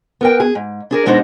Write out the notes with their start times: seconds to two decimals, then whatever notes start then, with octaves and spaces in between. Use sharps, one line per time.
0.21 B3 A#4 G5
0.40 G#4
0.55 G#2
0.91 D4 G#4 A#4
1.06 B2 G#3 D4 D#4 F#4 C5